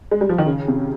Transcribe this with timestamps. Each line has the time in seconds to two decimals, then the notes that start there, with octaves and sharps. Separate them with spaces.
0.11 G#3
0.21 G3
0.29 F3
0.38 D#3
0.46 C#3
0.68 C3